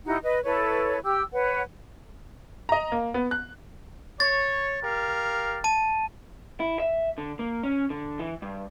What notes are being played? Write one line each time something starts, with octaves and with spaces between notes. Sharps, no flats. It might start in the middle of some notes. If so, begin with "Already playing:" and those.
D#4 E4 G4 F#5
B4 D#5
E4 A4 B4 C#5
G4 E6
B4 C#5 F#5
D#5 A#5
A#3
B3
F#6
C#5 A6
G4 A#4 F5
A5 D#7
E4
E5
D3
A#3
C#4
D3
E3
G2